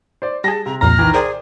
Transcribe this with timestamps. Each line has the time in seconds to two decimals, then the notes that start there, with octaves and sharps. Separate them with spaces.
0.22 C5 D5
0.44 G3 G#4 A5 A#6
0.66 C3 A#5
0.81 C2 F2 A#2 A#5 F6
0.99 D#3 E3
1.14 G#4 A#4 C5 D5 G5